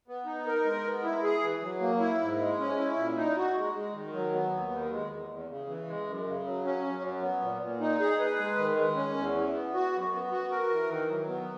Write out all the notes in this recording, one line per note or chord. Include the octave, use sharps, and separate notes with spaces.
B3
D#4
A#4
G#3
B3
E4
G#4
E3
F#3
A#3
E4
G#2
G#3
C#4
E4
A#2
D#4
F#4
G#3
G#3
D#3
F#3
B3
D#2
D#3
G#3
E2
E2
C#3
E3
G#3
F#2
C#3
F#3
C#4
F#2
F#3
B3
A#2
A#2
D#4
G#4
B4
G#3
D#3
G#3
C#4
E2
E3
B3
F#4
F#2
B3
F#4
A#4
E3
D#3
F#3
B3